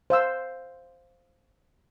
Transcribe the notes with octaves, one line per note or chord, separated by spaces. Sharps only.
C5 F5 E6